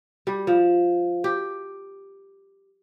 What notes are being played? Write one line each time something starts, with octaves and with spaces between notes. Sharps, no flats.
G3
F3
G4